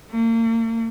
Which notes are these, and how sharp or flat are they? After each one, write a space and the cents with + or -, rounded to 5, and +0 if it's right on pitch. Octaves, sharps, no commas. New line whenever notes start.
A#3 -40